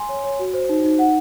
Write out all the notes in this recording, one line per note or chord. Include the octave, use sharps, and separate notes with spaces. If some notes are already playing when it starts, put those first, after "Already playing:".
Already playing: G#5 C6
C#5
C#5
F#4
C5
D#4
D#4
F#5